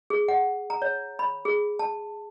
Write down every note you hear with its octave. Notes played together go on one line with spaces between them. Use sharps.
G#4
F#5
A#5
C#5
B5
G#4
A5